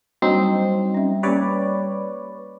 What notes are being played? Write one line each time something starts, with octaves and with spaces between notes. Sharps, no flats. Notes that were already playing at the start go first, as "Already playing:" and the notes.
F#3 G3 A#3 C4 D4 D#4
C#4 E5
A#3 C#4 G4 B4 C#5 D5